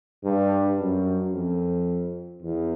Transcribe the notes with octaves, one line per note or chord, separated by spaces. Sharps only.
G2
F#2
F2
E2